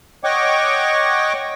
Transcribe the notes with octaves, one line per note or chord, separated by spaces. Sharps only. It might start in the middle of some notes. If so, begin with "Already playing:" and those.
C#5 D#5 F#5 G5 C#6 D6